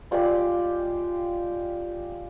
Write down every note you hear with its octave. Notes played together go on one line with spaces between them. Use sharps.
G#3 F4 G4 D5